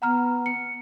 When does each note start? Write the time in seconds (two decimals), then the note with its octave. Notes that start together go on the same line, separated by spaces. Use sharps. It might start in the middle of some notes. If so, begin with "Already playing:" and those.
0.02 B3 F#5 A#5 F6
0.46 C#7